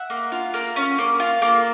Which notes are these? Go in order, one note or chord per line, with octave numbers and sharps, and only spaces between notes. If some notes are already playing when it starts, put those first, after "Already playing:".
Already playing: E5 F#5
A#3
F4
A#3
C#4
A#3
F4
A#3